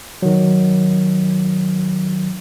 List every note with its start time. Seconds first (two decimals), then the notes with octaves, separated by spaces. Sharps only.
0.22 D#3 F#3